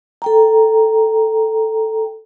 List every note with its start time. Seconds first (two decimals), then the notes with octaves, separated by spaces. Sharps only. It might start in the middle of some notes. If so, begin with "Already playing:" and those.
0.22 A4 G5 A#5